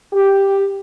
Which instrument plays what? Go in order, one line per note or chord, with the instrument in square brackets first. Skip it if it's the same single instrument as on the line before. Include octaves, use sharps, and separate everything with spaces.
[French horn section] G4